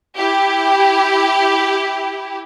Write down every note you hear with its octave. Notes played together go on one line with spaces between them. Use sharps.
E4 G4